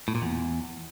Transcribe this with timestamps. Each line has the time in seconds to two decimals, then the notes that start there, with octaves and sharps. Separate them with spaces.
0.08 A2
0.15 A#2
0.22 E2